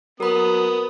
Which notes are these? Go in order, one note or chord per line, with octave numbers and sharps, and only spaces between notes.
F#3 B3 A#4 B5 D#6